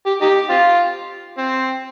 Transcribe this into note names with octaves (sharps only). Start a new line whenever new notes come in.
G4
D#4 G4
C4 F4
C4